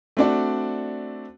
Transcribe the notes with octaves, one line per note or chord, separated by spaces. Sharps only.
A3 C4 D4 F#4 D5